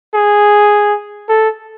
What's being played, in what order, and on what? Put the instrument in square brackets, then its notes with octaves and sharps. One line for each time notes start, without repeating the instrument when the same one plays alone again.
[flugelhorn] G#4
A4